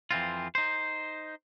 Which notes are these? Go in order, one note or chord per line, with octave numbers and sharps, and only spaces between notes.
F2 E3 C4 F4
D#4 C5